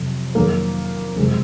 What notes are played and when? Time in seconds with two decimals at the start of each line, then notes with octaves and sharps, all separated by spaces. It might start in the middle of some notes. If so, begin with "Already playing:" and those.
Already playing: F2 C3 F#3
0.35 F2 D#3 F#3 A#3
1.16 F#1 F2 C3 G#3